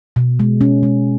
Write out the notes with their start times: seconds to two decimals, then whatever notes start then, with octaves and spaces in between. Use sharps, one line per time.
0.16 B2
0.39 G#3
0.61 C#4
0.83 G#3